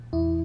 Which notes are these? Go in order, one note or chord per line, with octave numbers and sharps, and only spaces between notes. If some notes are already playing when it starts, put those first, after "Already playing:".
Already playing: A#2
E2 E4